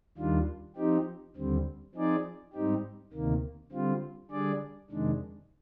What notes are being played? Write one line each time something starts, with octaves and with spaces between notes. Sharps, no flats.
D#2 D#3 G3 D4 F4
F3 C4 D#4 G4
D#2 D3 G3 C4
F3 C4 D#4 G#4 D5
G#2 G3 C4 D#4 G4
D2 C3 D#3 A#3
D3 G3 C4 F4
D3 G3 D4 G#4 D5
F2 C3 D#3 G#3 D4